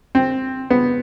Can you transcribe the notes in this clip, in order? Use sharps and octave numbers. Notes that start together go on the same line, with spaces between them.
C4
B3